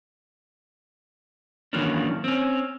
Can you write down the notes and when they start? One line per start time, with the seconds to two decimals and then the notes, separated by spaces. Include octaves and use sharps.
1.73 D#3 E3 F#3 A#3 C#4 D4
2.24 C4 C#4